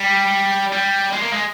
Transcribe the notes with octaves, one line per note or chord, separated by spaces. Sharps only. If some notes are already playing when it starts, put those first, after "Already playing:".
Already playing: G3
G3
G#3
A#3
G#3